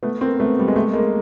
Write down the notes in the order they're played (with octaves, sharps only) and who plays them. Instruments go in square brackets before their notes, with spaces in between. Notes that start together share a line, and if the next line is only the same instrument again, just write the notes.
[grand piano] A3 B3
A#3 C4
A3 B3
G3
G#3
G3 A3
G#3 A#3